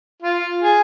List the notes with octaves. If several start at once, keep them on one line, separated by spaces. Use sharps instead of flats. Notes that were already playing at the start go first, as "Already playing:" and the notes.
F4
G#4